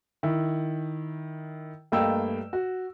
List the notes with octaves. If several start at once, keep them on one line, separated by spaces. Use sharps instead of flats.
D#3 E4
G2 A3 A#3 D#5 G5 E6
F#4